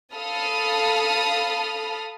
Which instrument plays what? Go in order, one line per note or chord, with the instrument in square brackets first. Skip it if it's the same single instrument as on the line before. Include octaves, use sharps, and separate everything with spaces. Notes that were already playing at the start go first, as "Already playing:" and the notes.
[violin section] A4 F5 A5 B5 D#6 F6